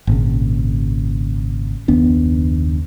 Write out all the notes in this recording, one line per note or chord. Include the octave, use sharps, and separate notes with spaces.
G#1 A#2 C#3
F#1 D#2 B3 D4